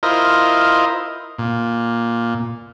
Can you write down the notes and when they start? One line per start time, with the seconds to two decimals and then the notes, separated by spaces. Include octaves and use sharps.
0.03 E4 F4 A#4 C5 D#5
1.38 A#2